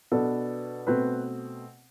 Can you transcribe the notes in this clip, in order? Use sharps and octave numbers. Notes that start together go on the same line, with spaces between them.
B2 B3 D4 A4
B2 A3 C4 B4